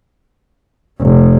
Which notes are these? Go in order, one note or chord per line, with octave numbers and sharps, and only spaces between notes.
F1